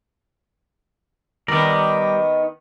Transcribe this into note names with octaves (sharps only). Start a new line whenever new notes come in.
D#3 G3 B3 D5 A#5